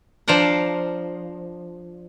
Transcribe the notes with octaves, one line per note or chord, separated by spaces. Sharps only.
F3 D4 C5 D5 A#5